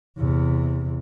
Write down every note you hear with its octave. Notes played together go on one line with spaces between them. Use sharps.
E2 C3